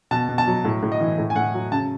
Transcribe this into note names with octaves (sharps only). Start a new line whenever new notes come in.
B2 A5
B2
A5
F#3
A2
A2
D#5
E3
A2
G#5
A2 F#5
F#3
C#3 A5